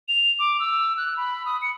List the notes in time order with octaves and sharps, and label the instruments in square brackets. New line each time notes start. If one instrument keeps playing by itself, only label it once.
[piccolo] F7
D6
E6
F#6
B5
D#6
C#7